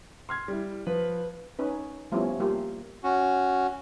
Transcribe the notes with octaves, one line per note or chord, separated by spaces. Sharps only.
C6 F6 G#6
G3 E4
F3 B4
C#4 D#4 B4
F3 G3 A3 B3 C#4 E4
G3 A#3 F4 G4
C#4 F#4